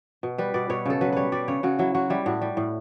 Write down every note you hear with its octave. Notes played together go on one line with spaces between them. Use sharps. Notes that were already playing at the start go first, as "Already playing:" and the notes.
B2
G3 B4
B2 D5
B2 C#5
C#3 A4
F#3 B4
G3 B4 C#5
G3 D5
C#3 C#5
C#3 F#4
F#3 E4
F#3 F#4
G3 E4
A2 F#4
G3
A2